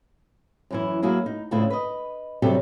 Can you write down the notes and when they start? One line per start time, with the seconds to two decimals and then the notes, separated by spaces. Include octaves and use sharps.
0.71 F#2 E3 E4
1.03 F#3 A#3 E4 F#4 G#4
1.26 D#4
1.51 D2 A2 C#3 A3 E4 F4
1.70 B4 D#5
2.42 C3 F#3 G3 D4 G4 A4